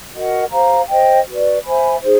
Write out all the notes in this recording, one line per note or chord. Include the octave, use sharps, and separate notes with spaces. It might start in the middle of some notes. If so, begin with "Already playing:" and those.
F#4 A#4 D#5 F#5
G4 C5 F5 A#5
C5 D#5 G5
F#4 B4 D5
C5 E5 G#5 B5
D#4 G#4 C5